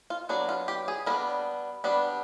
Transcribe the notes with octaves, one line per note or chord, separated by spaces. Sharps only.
F4
F#3 B3 D4 F#4
F4
G4
G#4
G3 B3 D4 A#4
G3 B3 D4